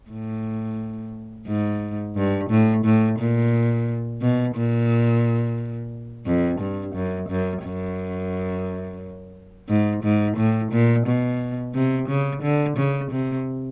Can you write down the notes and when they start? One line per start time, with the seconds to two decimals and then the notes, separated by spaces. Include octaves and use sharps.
0.10 A2
1.47 G#2
2.16 G2
2.50 A2
2.84 A2
3.19 A#2
4.21 B2
4.55 A#2
6.26 F2
6.60 G2
6.94 F#2
7.29 F#2
7.64 F#2
9.69 G#2
10.03 G#2
10.37 A2
10.71 A#2
11.06 B2
11.74 C3
12.08 C#3
12.42 D3
12.77 C#3
13.11 C3